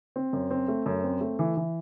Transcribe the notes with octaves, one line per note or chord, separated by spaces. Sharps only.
C4
F#2
C4
A3
F#2
C4
A3
E3
E3